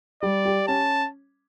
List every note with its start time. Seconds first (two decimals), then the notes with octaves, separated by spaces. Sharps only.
0.22 G3 D5
0.45 G4
0.67 C#4 A5